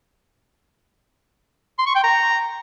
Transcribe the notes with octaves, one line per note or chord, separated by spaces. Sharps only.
C6
C#6
G5
A#5